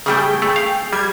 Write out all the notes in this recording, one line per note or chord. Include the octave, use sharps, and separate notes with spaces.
C#3 G3 A3 G#4 G5
A3
F5
G3 G#6